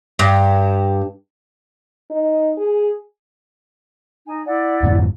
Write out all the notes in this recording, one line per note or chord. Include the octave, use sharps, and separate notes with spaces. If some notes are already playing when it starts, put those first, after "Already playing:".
G2
D#4
G#4
D#4 G#5
E4 D5 F#5
F2 G#2 D3